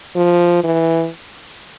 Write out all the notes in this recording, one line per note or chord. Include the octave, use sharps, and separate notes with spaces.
F3
E3